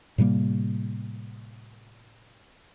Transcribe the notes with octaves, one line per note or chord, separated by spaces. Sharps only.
A2 C3 G3 A#3